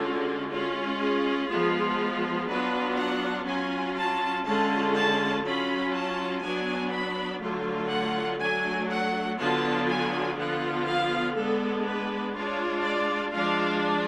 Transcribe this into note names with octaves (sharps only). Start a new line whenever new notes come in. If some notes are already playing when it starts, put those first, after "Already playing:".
Already playing: D3 G#3 C#4 F4 F#4
G#3 C#4 F4
G#4
F3 G#3 B3 F4
F#3 B3 D4 F4 B4
F#5
F#3 C#4 F4 G#5
A5
D3 G#3 C#4 F4 A5
A5
F#3 C#4 F4 B5
A5
F#3 B3 D4 G#5
B5
D3 F#3 A3 F4
F#5
F#3 A3 D4 G#5
F#5
D3 F#3 B3 D4 F4 A5
G#5
D3 F3 B3 F4 F#5
F5
G#3 B3 D4 A4
B4
G#3 D4 F4 C#5
D5
F3 G#3 D4 F4 F5